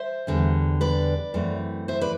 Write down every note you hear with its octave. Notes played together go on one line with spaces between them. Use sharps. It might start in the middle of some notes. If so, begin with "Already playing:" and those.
Already playing: C5 E5
E2 D3 G3
B4 D5
F#2 E3 A3 C4
C5 E5
B4 D5